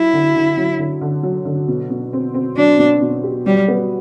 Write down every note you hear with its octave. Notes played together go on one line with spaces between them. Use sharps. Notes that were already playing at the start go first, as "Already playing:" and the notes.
Already playing: F#3 E4
D3
D3
F#3
D3
D3
F#3
D3
B2
B2
C4
C4
F#3 D4
B2
B2
G4
F#3 G3
B3